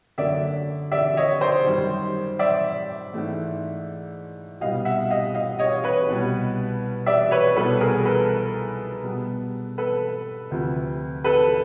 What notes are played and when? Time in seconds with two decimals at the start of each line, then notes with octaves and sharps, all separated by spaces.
0.18 F#2 D3 F#3 A#3 D5 E5
0.92 D5 E5
1.17 C#5 D#5
1.41 C5 D5
1.66 F#2 D#3 G3
2.39 D5 E5
3.14 G#2 E3 A3
4.61 C2 B2 G3 B3 D#5 F5
4.85 E5 F#5
5.10 D#5 F5
5.34 D#5 F5
5.59 C#5 D#5
5.84 B4 C#5
6.08 C2 B2 G3
7.06 D5 E5
7.31 B4 C#5
7.56 C2 B2 G3 A4 B4
7.80 G#4 A#4
8.05 A4 B4
9.03 B2 G3 B3
9.78 A4 B4
10.51 D2 C3 F3
11.24 A4 B4